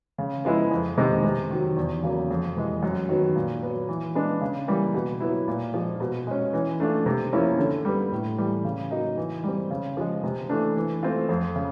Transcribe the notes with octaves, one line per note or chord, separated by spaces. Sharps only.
C#3
F3 G#3 B3 E4
F2
C3 D#3 G#3 C4
C3
D#3 F#3
E2
C#3 F#3 A#3
F2
C3 E3 G#3
F#2
D#3 F#3 B3
A#2
F#3 B3
E3
G#3 B3 D4
C#3
E3 G3 A#3
B2
F#3 B3 E4
A#2
F3 G#3
B2
G#3 C#4
E3
A3 D4 F4
C3
F3 A#3 C#4 E4
D3
G3 B3
A2
E3 G3
C#3
F#3 A#3 D#4
E3
G3 C4
C#3
F3 G#3
C3
E3 A3 D4
E3
A3 C4 F4
F2
C#3